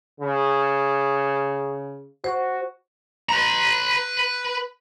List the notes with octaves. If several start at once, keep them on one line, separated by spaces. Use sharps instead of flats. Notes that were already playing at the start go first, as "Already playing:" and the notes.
C#3
F#4 C5 C#6
B4 A#5